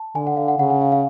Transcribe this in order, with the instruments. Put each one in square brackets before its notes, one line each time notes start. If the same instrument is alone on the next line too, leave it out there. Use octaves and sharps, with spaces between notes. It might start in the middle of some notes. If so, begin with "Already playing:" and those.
Already playing: [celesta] A5
[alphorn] D3 [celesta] G#5
[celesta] F#5
F5
F#5
[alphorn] C#3 [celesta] F#5
[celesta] F#5
F5
F5